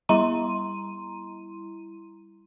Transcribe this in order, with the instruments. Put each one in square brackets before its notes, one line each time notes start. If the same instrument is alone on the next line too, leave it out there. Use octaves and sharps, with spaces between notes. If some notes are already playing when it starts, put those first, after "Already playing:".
[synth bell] G3 E4 A#5 C6 D#7